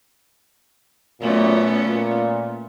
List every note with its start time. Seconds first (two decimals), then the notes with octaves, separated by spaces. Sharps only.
1.21 F#2 A#2 A3 B3 C#4
1.82 A#2